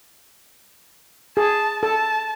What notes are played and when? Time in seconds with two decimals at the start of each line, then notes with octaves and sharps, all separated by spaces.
1.37 G#4 A5
1.83 A4 A5